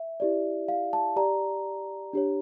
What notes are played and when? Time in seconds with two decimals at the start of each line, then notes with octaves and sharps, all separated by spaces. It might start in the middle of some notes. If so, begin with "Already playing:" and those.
Already playing: E5
0.20 E4 G4 D5
0.68 F5
0.93 A5
1.16 G4 D5 A#5
2.13 D4 G4 C#5